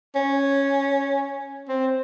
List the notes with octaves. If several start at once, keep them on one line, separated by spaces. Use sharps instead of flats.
C#4
C4